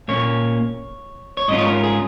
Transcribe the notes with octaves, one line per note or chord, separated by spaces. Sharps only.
A#2 A#3 C#4 C#5
C#5
G#2 G#3 C#4 F4 D#5
C#5
A#4
G#4